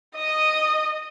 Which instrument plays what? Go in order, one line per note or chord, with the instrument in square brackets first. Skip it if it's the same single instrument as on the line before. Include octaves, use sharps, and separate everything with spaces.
[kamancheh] D#5 D#6